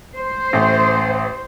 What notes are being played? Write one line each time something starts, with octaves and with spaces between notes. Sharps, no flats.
C5
A1 A3